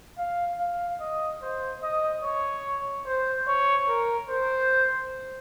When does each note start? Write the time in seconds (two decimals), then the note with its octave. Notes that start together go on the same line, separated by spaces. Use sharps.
0.18 F5
0.59 F5
1.01 D#5
1.42 C5
1.83 D#5
2.24 C#5
3.06 C5
3.47 C#5
3.88 A#4
4.29 C5